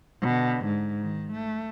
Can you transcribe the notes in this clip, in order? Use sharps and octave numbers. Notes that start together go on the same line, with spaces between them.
B2 D3
G#2
D#3
A3